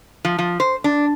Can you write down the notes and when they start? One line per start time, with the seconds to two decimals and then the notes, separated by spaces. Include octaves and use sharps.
0.25 F3
0.38 F3
0.60 C5
0.84 D4